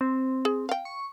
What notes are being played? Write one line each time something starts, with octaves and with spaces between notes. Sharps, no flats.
C4
G#4
F5 G5
C#6